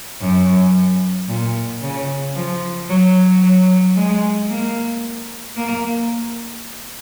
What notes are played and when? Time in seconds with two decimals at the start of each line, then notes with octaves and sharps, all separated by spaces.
0.22 F#2
1.28 A#2
1.82 C#3
2.36 F3
2.89 F#3
3.43 F#3
3.96 G#3
4.50 A#3
5.57 A#3